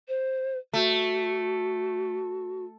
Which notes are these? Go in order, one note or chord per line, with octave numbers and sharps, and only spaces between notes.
C5
A3 F#4